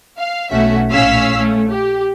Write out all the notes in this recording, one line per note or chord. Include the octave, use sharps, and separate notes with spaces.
F5
B1 A3 C#4 F#4 E5
A#1 A2 C#4 F5 E6 B6
A3 C#4
G4